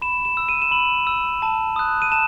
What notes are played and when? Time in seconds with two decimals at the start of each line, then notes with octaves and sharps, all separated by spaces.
0.02 B5 E7
0.25 E7
0.37 E6
0.49 D#7
0.62 E7
0.71 B5 F#7
1.07 E6
1.42 A5
1.76 D#6 F#6
2.02 D#7
2.11 A5 E7